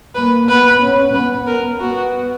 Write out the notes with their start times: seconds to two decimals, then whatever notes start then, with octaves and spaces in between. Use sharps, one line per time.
0.15 A#3 B4
0.49 B3 B4
0.82 C#4
1.14 B3 B4
1.47 A#4
1.80 B3 F#4